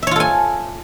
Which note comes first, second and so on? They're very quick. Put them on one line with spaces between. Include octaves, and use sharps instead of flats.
E5 C#5 F4 A4 G#5